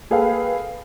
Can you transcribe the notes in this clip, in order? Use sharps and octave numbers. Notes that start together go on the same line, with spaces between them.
A#3 G#4 A4 B4 F5 G5